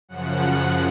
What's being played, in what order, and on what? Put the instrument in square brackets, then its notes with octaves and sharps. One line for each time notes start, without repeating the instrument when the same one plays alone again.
[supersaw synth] F#2 C#3 F3 F#5 F#6